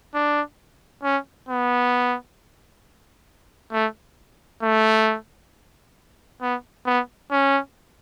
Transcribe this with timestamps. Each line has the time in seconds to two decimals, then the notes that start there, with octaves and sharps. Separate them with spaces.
0.14 D4
1.03 C#4
1.49 B3
3.73 A3
4.62 A3
6.41 B3
6.86 B3
7.32 C#4